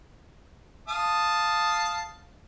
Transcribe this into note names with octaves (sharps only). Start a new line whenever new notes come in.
F5 A5 D#6